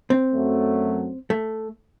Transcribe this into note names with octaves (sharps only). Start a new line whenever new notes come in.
C4
F#2 F#3 A3
A3